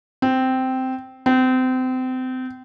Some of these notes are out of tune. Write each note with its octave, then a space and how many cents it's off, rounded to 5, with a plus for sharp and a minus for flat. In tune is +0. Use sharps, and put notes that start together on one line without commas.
C4 -10
C4 -30